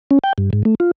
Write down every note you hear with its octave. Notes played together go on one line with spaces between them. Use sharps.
C#4
G5
G2
G#2
A3
F4